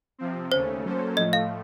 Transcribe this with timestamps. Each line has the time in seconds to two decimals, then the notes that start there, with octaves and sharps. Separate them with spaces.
0.18 C3 F3 C4
0.51 D#2 C#3 A3 C#4 C5
0.84 F#3 A#3 C#4 A4 C5
1.17 A2 F3 A3 D#5
1.33 F5